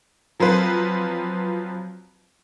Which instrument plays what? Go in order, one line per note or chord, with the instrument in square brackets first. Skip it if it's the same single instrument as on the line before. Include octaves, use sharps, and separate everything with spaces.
[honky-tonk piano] F3 F#3 C4 F4 B4